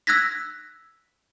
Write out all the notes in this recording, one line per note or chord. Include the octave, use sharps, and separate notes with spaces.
E6 F#6 G#6 A#6 B6